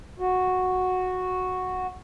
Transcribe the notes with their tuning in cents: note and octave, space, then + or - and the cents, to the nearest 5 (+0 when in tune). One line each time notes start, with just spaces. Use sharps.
F#4 -5